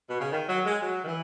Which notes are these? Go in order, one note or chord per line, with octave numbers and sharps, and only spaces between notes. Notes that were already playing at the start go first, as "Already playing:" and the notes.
B2
C#3
D#3
F#3
G#3
F#3
D#3
E3